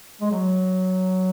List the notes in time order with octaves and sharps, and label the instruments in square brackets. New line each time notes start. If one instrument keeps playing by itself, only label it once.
[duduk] G#3
F#3